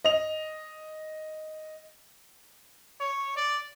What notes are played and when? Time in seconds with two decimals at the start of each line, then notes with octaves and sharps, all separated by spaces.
0.04 D#5 F7
3.00 C#5
3.36 D5